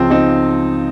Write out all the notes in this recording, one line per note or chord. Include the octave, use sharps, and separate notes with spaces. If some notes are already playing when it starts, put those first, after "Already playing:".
Already playing: C#2 C#3 F3 C4
C4 D#4